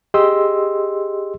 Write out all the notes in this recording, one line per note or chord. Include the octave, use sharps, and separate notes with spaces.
G4 G#4 D#5 C6 E6